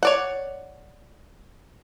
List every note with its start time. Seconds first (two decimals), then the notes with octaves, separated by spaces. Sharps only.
0.03 C#5 D5 F#5